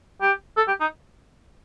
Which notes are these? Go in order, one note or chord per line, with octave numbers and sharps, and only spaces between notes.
G4
A4
G4
D#4